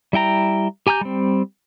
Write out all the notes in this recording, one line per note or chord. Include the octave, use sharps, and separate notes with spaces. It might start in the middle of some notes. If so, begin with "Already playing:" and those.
G3 E4 G5 A#5
G4 G#5 A#5 E6 G6
G3 C4